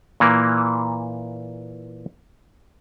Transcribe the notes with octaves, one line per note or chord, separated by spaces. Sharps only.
A#2 E3 A#3